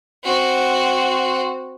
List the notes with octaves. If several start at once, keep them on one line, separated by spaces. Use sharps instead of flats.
C4 F#4